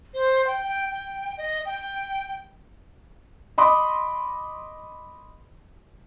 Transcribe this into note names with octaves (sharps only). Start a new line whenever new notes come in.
C5
G5
G5
G5
D#5
G5
D#5 B5 C6 D6 D#6